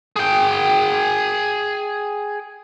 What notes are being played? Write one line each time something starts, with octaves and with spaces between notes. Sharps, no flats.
G#4 G5